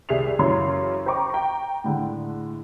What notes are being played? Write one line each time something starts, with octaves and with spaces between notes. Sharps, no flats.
C2 G#4 D5 E5 C7 F7
F#2 C#3 E3 C#5 C6
C5 G5 A#5 C#6 D6
G5 A#5
A2 D3 G#3